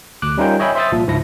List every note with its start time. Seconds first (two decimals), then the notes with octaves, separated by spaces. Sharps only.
0.22 D2 D6 F#6
0.37 G3 C#4 D#4 F4 A#4 G5
0.59 C#5 D#5 E5 G5 G#5 B5
0.75 C5 E5 C6 D#6 E6 A6
0.92 C2 A#2 F3
1.07 C#2 G#2 F3 E4 A#6